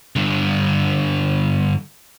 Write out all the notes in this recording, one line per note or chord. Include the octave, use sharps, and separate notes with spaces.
G2 D3